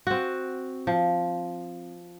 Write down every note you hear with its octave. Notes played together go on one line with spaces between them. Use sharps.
C4 F#4
F3